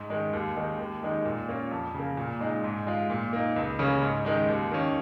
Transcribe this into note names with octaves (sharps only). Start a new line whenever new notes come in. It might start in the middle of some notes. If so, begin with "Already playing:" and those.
Already playing: G#2
D#3 G#3
D#2
D#3 G#3 D#4
D#2
D#3 G#3 D#4
A#2
A#3 C#4 F4
F2
C#3 A#3
A#2
G#3 D#4
G#2
G#3 F4
A#2
A#3 D#4
C#2
C#3 A#3 C#4
G#2
D#3 G#3 D#4
D#2
D#3 A#3 C#4